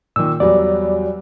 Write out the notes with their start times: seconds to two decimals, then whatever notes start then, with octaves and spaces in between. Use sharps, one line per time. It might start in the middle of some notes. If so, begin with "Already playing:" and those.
0.16 A#2 D#3 E6
0.40 E2 F#3 G3 D5